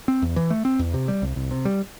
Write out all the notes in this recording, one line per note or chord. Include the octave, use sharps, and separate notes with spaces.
C4
E2
E3
A3
C4
E2
C3
G3
C2
C2
C3
G3